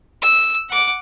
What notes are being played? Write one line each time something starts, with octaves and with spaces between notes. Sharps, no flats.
E6
F#5 D6